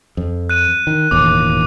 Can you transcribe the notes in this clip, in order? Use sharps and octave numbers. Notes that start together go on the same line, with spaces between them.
F2
F#6 D#7
D#3
E1 A1 D#2 D6